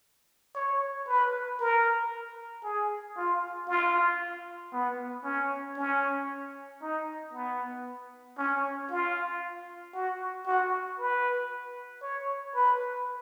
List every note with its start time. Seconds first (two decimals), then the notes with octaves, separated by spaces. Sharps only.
0.55 C#5
1.08 B4
1.60 A#4
2.64 G#4
3.17 F4
3.68 F4
4.73 B3
5.24 C#4
5.78 C#4
6.82 D#4
7.33 B3
8.38 C#4
8.90 F4
9.94 F#4
10.47 F#4
10.99 B4
12.02 C#5
12.55 B4